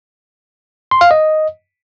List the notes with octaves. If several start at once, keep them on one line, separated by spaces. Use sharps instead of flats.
C6
F5
D#5